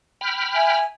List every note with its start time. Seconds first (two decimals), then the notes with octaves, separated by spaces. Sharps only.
0.21 G5 B5 F6
0.53 E5 G#5